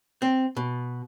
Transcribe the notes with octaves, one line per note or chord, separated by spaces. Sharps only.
C4
B2